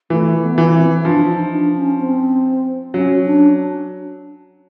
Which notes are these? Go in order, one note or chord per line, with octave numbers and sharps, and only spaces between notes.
E3 A3
B3
E3
C4
F3 D4
D#4
D4
C#4
C4
F#3 C#4
D4